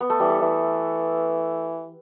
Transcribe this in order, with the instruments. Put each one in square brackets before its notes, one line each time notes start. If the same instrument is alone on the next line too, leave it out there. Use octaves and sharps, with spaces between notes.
[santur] B3
A3
[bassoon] E3 [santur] G3
[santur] A3
[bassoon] E3